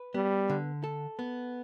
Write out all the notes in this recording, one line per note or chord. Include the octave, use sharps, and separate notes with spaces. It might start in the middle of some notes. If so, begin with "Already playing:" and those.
Already playing: B4
G3 B3
D3
A4
B3